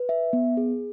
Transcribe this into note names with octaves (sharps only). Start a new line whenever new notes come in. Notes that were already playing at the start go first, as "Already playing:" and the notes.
Already playing: B4
E5
B3
G#4